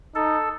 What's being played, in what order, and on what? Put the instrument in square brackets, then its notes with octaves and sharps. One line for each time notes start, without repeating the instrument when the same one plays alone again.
[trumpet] D#4 [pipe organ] A4